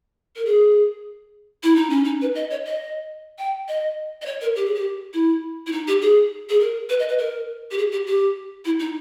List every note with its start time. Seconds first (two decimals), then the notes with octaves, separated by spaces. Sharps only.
0.36 A#4
0.46 G#4
1.63 E4
1.76 D#4
1.90 C#4
2.04 D#4
2.21 B4
2.35 D#5
2.51 C#5
2.66 D#5
3.39 G5
3.68 D#5
4.22 D#5
4.26 C#5
4.41 A#4
4.56 G4
4.66 G#4
4.75 G4
5.14 E4
5.67 E4
5.72 D#4
5.88 G4
6.02 G#4
6.49 G#4
6.60 A#4
6.89 B4
6.99 D#5
7.09 B4
7.19 A#4
7.71 G4
7.78 G#4
7.92 G4
8.07 G4
8.65 E4
8.80 D#4